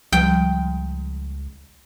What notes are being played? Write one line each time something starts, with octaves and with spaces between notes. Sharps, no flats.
C#2 F3 G3 G5